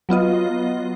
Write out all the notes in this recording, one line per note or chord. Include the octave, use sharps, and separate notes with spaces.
F#3 B3 F4 D#5